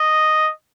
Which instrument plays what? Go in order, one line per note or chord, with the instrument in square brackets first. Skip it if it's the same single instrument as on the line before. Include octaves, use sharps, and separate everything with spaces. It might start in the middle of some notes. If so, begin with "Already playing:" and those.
Already playing: [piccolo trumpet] D#5